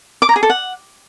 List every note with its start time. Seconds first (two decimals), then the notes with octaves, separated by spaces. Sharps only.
0.22 D6
0.29 A#5
0.36 G#4
0.43 A4
0.50 F#5